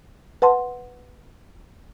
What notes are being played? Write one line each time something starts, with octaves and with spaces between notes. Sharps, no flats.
B4 F#5 A5 C6